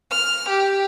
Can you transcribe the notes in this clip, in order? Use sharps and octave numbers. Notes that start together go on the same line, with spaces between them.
F6
G4